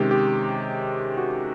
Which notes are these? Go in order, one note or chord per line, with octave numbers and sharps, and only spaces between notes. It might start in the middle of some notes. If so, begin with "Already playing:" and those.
Already playing: C3 D#3 G#3 C#4 G4
G4
F#4